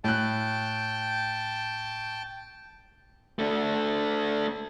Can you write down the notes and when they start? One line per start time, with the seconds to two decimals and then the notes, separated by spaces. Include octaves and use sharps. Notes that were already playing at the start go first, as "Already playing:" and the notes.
0.04 A2 G5 A5 F#6
3.39 A3 D4